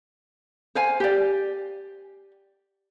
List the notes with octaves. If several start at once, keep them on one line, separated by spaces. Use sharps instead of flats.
C5 F5 G#5
G4 D5